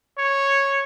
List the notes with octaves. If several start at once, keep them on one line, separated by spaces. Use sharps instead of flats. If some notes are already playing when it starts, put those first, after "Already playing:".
C#5